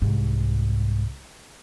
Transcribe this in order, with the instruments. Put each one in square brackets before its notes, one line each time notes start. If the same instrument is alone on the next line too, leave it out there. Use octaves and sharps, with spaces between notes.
[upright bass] C2 G#2